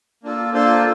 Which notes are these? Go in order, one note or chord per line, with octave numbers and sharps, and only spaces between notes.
A#3 D4 F4 A4
A#3 D4 F4 A4 C5